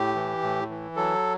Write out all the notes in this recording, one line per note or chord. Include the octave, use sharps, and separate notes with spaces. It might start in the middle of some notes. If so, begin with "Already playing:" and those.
Already playing: A2 G4
E3
A2
E3
F#3 A4